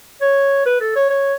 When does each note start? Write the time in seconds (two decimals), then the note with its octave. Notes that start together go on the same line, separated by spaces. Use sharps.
0.21 C#5
0.66 B4
0.80 A4
0.96 C#5
1.10 C#5